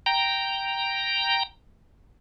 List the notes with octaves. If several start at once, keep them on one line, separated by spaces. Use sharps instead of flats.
G5 A#5